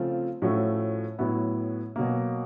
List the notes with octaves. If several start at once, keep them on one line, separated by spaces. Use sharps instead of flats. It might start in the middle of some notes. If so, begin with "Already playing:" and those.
Already playing: C#3 F3 A3 C4 F4
A2 F3 A3 C#4 F#4
A2 F#3 B3 E4
B2 F#3 A#3